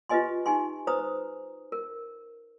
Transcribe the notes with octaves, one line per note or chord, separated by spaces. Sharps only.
F4 G4 B4 D#5 G#5 C6
D#4 G4 G#5 C6
B4 C5 A#5 D#6
A#4